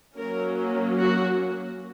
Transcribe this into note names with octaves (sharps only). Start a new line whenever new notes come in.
F#3 A#3 C#4 A#4
F#4